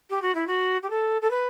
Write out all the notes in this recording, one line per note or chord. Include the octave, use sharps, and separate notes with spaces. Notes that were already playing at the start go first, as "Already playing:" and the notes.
G4
F#4
E4
F#4
G4
A4
A4
B4